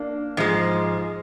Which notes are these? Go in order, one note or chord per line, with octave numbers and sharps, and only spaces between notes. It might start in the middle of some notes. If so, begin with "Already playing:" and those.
Already playing: A#3 D4
G#2 F3 G#3